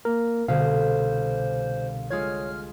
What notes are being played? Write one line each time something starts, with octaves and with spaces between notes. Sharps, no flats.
A#3 A#4
C2 B2 D3 C5 F5
G#3 F4 C#5 F6 G#6